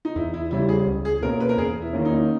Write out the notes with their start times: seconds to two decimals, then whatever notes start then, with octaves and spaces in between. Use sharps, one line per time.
0.05 D#4
0.16 E2 E4
0.34 E4
0.51 C#3 G3 C#4 E4
0.69 G#4
0.87 C#2
1.05 G#4
1.23 B2 A#3 C#4 A#4
1.40 B4
1.49 A#4
1.58 E2 G#4
1.82 E4
1.93 D#3 A#3 C#4
2.05 D#4